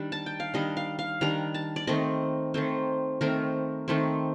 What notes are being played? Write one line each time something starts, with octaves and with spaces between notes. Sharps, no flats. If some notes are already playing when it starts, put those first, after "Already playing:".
Already playing: D#3 G3 D4
A5
G5
F5
D#3 G3 D4 D#5
F5
F5
D#3 G3 D4 A#5
A5
D5
D#3 A3 C4 D#5
D#3 A3 C4 C5
D#3 A3 C4 A#4
D#3 A3 C4